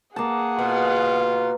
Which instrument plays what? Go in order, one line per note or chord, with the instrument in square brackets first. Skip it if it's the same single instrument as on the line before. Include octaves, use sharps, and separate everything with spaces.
[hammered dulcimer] A#3 A5 [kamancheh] G#4 F#5
[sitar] B2 [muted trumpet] F4